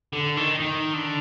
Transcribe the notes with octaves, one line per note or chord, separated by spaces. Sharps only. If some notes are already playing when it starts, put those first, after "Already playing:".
D3
D#3
D#3
D3